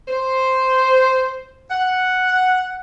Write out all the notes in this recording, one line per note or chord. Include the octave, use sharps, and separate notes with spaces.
C5
F#5